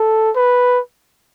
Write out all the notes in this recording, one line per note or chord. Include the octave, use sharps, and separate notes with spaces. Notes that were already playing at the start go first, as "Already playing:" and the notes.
Already playing: A4
B4